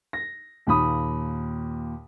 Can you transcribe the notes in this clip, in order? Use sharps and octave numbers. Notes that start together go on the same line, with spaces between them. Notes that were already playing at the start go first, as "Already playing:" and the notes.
A#6
D#2 A#2 B5 D#6